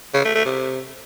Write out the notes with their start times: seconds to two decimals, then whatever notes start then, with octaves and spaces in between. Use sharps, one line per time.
0.14 C#3
0.25 A3
0.35 A3
0.45 C3